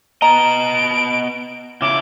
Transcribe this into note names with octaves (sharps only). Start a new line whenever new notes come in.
B3 D#5 A#5 D7
C#3 E4 D6